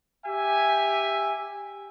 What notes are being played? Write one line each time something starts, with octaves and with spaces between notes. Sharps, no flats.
G4 E5 G#5